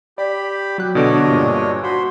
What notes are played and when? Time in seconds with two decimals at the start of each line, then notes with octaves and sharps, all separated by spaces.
0.18 G4 D5 B5
0.78 F#3 F#6
0.95 B2 D3 D4 C#5 D#5 D7
1.28 G2 A#2
1.84 F#4 C5 B5 C6